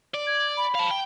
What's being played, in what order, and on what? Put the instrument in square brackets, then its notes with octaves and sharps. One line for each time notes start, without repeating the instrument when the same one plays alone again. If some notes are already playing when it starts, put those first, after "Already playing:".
[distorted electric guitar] D5
[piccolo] G#6
B5
[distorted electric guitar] F5 A5
G5